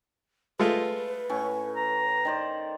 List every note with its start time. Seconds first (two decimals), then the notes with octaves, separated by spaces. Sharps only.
0.59 G#3 A3 F4 B4
1.29 A2 C#4 C#6
1.76 A#5
2.25 D#3 C5 D5